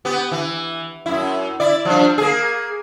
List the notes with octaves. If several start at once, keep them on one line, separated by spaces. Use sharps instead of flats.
B3 G4
E3
F#2 E4
E4 D5
F3 G3 D4
A#3 G#4